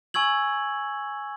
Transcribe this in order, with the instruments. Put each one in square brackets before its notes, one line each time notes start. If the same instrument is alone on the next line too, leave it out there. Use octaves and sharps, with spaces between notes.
[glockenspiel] G#5 C#6 E6 G#6 F#7